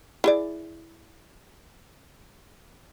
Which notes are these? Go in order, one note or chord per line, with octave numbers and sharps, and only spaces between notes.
E4 G#4 D5